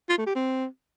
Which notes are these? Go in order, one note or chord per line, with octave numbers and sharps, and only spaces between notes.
F4
A3
G4
C4